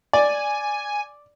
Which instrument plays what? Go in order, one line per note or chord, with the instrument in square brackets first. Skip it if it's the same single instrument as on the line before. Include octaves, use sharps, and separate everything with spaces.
[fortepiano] D5 [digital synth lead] G#5